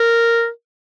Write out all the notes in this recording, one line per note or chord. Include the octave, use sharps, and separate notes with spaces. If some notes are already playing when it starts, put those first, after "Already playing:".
Already playing: A#4